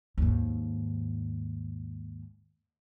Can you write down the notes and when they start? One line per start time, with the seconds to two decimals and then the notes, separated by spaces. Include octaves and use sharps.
0.18 D#2 G#2